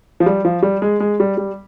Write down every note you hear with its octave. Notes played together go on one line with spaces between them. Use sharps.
F3
G3
F3
G3
G#3
G#3
G3
G3